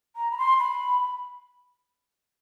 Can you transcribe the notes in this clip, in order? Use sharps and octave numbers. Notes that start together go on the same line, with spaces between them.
A#5
B5
C6
B5